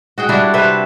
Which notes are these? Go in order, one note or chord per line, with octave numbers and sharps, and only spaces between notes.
F#4 G#4 G5
G3 D4 E4 F#4
C3 B4 C5 E5